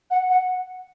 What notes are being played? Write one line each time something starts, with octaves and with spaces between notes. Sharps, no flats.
F#5
F#5